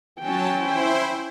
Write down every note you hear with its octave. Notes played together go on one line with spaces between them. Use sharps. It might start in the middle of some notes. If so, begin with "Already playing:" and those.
F#3 C#4 G5 A5
E4 C5